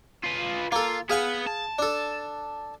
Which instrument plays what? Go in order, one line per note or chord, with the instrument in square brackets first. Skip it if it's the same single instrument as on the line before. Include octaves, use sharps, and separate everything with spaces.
[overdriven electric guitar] F4 B4
[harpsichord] A#3 A4 [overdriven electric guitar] F4
[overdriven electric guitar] B3 F#5 [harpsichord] G#4 F5 G#5
[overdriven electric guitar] A5
[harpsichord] D4 A4